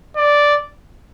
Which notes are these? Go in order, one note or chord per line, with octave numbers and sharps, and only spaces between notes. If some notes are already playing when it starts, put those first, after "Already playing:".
D5